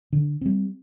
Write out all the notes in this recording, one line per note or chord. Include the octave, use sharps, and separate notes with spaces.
D3
G3 C4